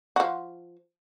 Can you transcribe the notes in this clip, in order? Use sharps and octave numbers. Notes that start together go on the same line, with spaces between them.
F3 F#4